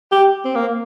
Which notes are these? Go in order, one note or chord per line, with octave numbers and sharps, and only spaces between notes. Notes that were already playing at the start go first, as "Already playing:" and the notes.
G4
C4
A#3